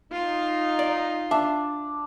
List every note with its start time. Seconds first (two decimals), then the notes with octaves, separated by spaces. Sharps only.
0.12 D#4 F4
0.79 D5
1.31 D4 E5